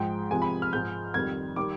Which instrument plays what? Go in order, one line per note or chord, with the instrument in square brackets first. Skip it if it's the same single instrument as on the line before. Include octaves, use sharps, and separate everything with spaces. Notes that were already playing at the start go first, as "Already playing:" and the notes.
Already playing: [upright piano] G#2 F3 G#3 G5
C3 F3 G#3 G#5
B5
F6
G#2 F3 G#3 G6
F2 D#3 G3 G#6
D#3 G3 D6